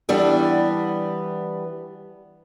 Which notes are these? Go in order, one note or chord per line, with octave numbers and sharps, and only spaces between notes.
E3 G3 B3 D4